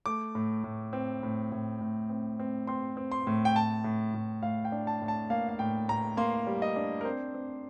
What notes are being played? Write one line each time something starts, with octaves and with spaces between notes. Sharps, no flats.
A3 D6
A2
A2
C4
A2
A2
A2
C4
C4
C4 C6
C4
C6
A2
G5
A2 A5
A2
A2
A2 F5
G5
D4
A5
A2
A5
A#3 F5
F5
A2 G5
A2 A#5
A#3 C6
G3
D#5
D4
A#4
C4 C5
C4